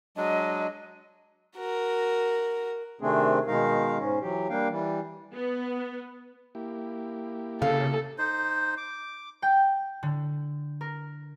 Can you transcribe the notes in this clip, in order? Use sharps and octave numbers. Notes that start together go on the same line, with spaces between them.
F#3 G#3 D4 D#5
F#4 A#4
C3 D#3 A3 C4 D4 G#4
B2 D#3 G#3 D#4 A#4 F5
G#2 C#4
E3 F#3 G4
G3 A#3 D4 F5 G5
E3 G3
B3
A#3 E4 G4
C#3 A4 F5
D#4 C5
D6
G5
D3
A#4